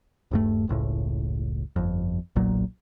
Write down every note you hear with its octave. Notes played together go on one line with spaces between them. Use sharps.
D#1 G2 A3
F#1 C#2 A2
G1 F2
F#1 B1 A#2 F#3